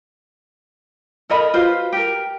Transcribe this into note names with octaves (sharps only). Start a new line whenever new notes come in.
A4 A#4 D#5 B5
F4 F#4 B4 C5
G4 A#4